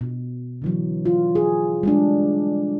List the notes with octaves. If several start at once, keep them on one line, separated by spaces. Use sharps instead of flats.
B2
D3 E3 F#3
F4
G#4
G3 G#3 D4